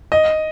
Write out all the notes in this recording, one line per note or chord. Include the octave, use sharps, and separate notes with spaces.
D#5